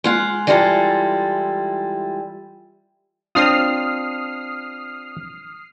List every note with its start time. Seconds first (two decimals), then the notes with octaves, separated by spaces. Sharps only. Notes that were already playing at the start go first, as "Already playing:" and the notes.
0.04 G#3 F4 F#5
0.47 E3 G3 G#3 E4 F4 A4
3.35 C4 D4 F4 D#6 F6 C7